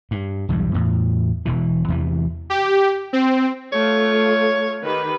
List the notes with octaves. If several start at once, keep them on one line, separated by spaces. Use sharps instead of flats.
G2
B1 E2 G2 G3
E2 A2
E1 B2 E3
E2 C3 E3
G4
C4
A3 F4 C#5
D#3 G4 B4